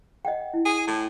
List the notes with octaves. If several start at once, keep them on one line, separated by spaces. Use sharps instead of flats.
D#5 F#5 G5
E4
G#4
A2 A5